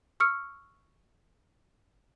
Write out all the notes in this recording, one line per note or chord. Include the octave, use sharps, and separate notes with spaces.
C#6 E6 F6 C#7